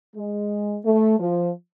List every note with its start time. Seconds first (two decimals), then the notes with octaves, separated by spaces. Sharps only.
0.16 G#3
0.85 A3
1.20 F3